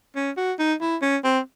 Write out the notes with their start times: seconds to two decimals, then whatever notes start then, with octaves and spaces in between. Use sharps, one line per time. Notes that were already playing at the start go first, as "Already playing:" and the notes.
0.15 C#4
0.37 F#4
0.59 D#4
0.81 E4
1.02 C#4
1.24 C4